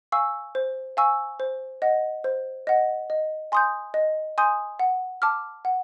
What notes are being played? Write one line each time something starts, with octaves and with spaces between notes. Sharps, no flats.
F5 G#5 C#6 E6
C5
F5 G#5 C#6 E6
C5
D#5 F#5
C5
D#5 F#5
D#5
G#5 C6 D#6 G6
D#5
G#5 C6 D#6 G6
F#5
A5 D6 F6
F#5